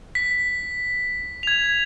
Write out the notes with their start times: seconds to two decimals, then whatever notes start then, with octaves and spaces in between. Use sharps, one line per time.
0.15 B6
1.43 G#6 F7